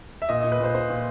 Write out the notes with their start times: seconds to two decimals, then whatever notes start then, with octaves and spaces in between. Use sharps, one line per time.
0.22 E5
0.29 A#2 D#5
0.41 A#2 D#5
0.52 B4
0.60 A#2 C5
0.75 A#2 C5
0.90 A#2